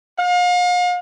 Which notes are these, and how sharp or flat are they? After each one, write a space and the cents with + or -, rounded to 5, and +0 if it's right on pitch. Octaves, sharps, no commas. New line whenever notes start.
F5 +40